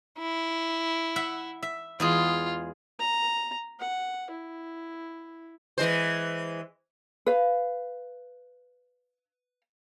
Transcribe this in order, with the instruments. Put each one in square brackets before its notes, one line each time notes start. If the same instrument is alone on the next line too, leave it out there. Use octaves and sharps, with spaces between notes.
[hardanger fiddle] E4
[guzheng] E5 F#5
E5
[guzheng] E2 G#3 G#4 [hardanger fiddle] F4
[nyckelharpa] A#5
F#5
E4
[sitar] E3 G#3 C5
[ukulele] B4 F5